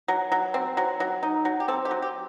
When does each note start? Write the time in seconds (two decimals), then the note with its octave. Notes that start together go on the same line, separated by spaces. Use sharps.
0.08 F#3
0.32 F#3
0.54 C4
0.77 F#3
1.00 F#3
1.23 D#4
1.45 F#3
1.60 G4
1.68 C4 A4
1.85 G4
1.91 F#3
2.02 G4